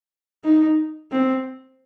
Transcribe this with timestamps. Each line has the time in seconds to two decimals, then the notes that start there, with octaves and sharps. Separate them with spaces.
0.44 D#4
1.11 C4